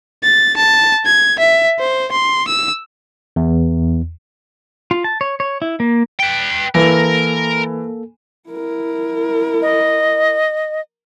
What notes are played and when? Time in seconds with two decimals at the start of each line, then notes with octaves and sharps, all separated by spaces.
0.23 A6
0.57 A5
1.06 G#6
1.39 E5
1.80 C5
2.12 C6
2.47 E6
3.36 E2
4.91 F4
5.04 A5
5.21 C#5
5.40 C#5
5.62 E4
5.80 A#3
6.19 B4 G5
6.75 E3 A#3 A4 A#4
8.49 E4 A#4
9.62 D#5